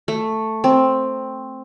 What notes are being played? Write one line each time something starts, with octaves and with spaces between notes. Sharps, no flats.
A3
C4